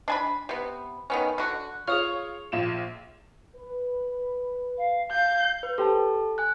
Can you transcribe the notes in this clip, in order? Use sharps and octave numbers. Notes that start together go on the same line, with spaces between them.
D4 G#5 B5
C3 B3
D#3 B3 C#4
D3 F#4
F4 G#4 C#5 C#6 D#6 F6
A#1 F4 E7
B4
F5
F5 G6
B4
G4 A4 C5 A5
G#5 F#6